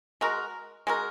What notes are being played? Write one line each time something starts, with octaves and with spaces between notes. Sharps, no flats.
G#3 F#4 A#4
G#3 F#4 A#4